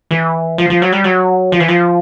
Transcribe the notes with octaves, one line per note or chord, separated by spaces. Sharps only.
E3
F3
F3
F#3
G3
F#3
F3
E3
F3